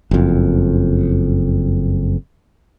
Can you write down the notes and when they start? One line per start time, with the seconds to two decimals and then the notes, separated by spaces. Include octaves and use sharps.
0.11 F#1 F2